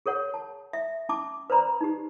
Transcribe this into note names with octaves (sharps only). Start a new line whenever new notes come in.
G#4 A#4 C#5 F#5
A5
E5
C#4 A5 D6
B4 C5 D5 A#5 B5
D#4 G4